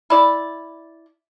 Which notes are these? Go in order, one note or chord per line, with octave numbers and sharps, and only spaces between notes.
E4 D5